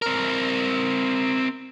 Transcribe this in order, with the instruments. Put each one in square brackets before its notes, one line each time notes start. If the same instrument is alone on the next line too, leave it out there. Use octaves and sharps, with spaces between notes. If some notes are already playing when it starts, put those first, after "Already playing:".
[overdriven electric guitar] C4 A#4